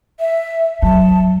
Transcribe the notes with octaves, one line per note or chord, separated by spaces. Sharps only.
E5
F#3 A5